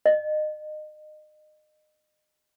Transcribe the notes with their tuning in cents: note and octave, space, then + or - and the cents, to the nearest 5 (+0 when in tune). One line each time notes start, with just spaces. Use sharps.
D#5 -30